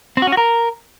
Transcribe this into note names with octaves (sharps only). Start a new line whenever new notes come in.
C4
F#4
C#4
F#4
A#4